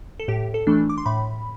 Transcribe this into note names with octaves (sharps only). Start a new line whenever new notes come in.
A4
A2 G4
A4
E3 A3 D4
D6
C6
A2 B5